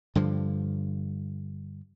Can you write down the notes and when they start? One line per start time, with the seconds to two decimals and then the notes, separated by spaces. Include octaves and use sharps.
0.15 G2 D3 F3